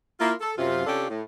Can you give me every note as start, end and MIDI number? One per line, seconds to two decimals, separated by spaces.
0.20 0.33 58
0.20 0.33 64
0.20 0.33 65
0.41 0.53 69
0.58 0.85 42
0.58 0.85 48
0.58 0.85 65
0.86 1.06 48
0.86 1.06 61
0.86 1.06 62
0.86 1.06 65
0.86 1.06 67
0.86 1.06 69
1.09 1.22 45